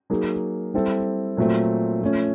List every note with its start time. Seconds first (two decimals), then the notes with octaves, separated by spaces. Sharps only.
0.10 F#3 A#3 D#4 G#4
0.74 G3 C4 E4 A4
1.37 A#2 F#3 A3 C4
2.01 F3 A3 C#4